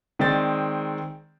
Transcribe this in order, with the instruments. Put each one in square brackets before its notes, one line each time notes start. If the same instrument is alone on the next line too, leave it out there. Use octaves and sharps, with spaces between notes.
[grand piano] D#3 G#3 C4 D5 G5 A6